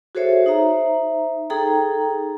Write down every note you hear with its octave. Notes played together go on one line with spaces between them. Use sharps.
F#4 G#4 A4 C5 C#5 E5
D#4 C5 E5 A#5
D#4 G#4 A4 G5 A#5